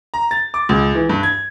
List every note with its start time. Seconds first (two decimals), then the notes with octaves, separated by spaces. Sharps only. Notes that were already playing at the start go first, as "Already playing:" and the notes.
0.14 A#5
0.31 A6
0.54 D6
0.69 C#2
0.95 E3
1.09 G2
1.23 G#6